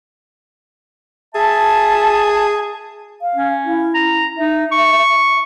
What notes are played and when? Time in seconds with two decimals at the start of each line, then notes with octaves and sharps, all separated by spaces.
1.35 G#4 E5 A5
3.22 F5
3.35 C#4
3.65 E4
3.94 A#5
4.38 D#4 E5
4.71 C#6